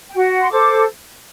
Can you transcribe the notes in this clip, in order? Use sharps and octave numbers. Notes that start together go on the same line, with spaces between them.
G5
F#4 F#5
C6
A4 C5 D6